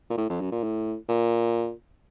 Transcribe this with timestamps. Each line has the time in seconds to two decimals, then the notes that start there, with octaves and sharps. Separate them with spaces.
0.10 A#2
0.18 A2
0.29 F2
0.41 F#2
0.52 A#2
0.63 A2
1.09 A#2